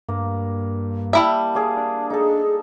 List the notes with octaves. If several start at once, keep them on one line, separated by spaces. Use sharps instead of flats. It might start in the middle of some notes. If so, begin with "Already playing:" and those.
G2 A#3
G3 E4 E5 A5
G#4 D5 F5
D4
D#4 G#4 A4